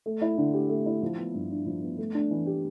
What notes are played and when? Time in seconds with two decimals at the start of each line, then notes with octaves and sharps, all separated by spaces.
0.06 A3
0.21 E4
0.38 D3
0.53 G4
0.69 A3
0.86 E4
1.03 F3
1.18 B3
1.34 G2
1.51 D4
1.66 F3
1.83 B3
1.98 A3
2.15 D4
2.31 E3
2.46 G4